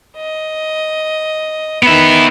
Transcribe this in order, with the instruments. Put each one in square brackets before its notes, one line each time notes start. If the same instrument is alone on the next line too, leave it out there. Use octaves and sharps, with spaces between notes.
[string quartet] D#5
[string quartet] D#3 B4 [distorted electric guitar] B3 E5